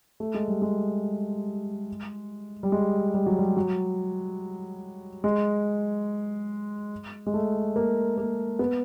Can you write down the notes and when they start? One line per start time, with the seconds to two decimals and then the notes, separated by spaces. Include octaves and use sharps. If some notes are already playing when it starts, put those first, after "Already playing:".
0.20 A3
0.34 G#3
0.48 G3
0.62 G#3
2.63 G3
2.72 G#3
3.14 G3
3.26 F#3
3.39 G3
3.56 F#3
5.24 G#3
7.27 G#3
7.34 A3
7.76 A#3
8.18 A#3
8.59 B3